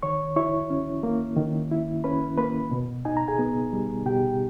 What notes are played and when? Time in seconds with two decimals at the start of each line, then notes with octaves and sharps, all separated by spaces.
0.03 D#3 C#5 C#6
0.36 E4 C#5 C#6
0.70 C#4
1.03 A#3
1.37 D#3
1.71 E4
2.04 C#4 B4 B5
2.38 A#3 B4 B5
2.71 B2
3.05 D#4 G#5
3.17 A#5
3.28 G#4 G#5
3.39 B3
3.73 G3
4.06 B2 G4 G5